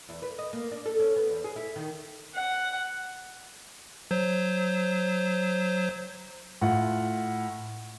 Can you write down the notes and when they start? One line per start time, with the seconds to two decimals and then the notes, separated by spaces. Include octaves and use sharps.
0.09 E2
0.22 B4
0.39 D#5
0.53 A#3
0.72 D4
0.86 A4
1.00 C#4
1.16 B3
1.30 E2
1.44 G#4
1.56 E4
1.76 D#3
2.35 F#5
4.11 F#3 C5
6.61 A2 F4 F#5